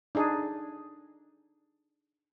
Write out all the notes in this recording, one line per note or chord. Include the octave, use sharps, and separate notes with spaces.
D4 D#4 G#4